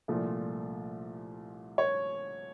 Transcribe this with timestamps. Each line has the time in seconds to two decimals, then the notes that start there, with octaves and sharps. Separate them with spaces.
0.08 C2 A#2 F3 A3 D4
1.78 C#5